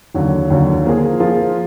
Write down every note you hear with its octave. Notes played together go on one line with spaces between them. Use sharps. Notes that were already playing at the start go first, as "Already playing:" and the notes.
D#2 D3 F#3
D#2 D3 F#3
F3 A#3 F4 G#4
F3 A#3 F4 G#4